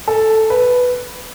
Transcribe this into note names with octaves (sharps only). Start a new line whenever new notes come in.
A4
B4